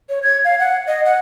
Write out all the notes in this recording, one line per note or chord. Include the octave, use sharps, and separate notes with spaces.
C#5
G#6
F5
F#5
D#5
F#5